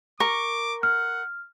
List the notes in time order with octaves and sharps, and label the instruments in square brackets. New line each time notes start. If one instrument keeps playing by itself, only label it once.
[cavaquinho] A#4 C#6 [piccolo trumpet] D6
[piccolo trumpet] F#5 [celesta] F6